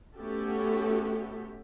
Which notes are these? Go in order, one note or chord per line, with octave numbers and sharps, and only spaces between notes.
A3 B3 C#4 F#4 G4 A4